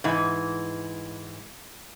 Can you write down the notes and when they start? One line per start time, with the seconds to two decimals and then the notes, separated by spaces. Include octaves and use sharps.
0.04 G#2 E3